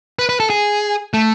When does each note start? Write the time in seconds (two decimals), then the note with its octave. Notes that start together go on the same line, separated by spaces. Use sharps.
0.19 B4
0.29 B4
0.40 A4
0.50 G#4
1.14 A3